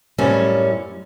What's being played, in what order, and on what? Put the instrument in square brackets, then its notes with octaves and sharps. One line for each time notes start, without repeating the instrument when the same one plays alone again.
[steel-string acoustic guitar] F#2 A2 G3 C4 C#4